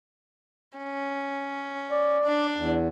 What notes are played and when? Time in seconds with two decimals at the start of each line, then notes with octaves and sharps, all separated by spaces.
0.78 C#4
1.91 D5
2.24 D4
2.56 E2